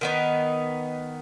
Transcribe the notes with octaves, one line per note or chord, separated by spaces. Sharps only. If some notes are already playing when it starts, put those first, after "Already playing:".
D#3 B3 D#4